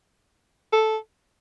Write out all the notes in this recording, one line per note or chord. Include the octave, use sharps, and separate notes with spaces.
A4